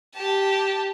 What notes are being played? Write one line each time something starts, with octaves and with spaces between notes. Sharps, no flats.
G4 A5